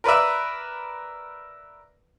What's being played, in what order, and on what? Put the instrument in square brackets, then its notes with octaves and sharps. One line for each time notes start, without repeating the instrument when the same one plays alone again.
[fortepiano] A#4 B4 D5 E5